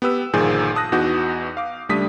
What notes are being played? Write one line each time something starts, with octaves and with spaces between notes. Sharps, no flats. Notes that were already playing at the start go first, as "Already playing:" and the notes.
B3 G4 B4 E6
G1 A#2 D#3 F3 G#4 G6
A5 D#6 F#6 A#6
E2 B3 D#4 F#4 D6 G6
F5 D6
C#2 G3 A3 D4 D#6 B6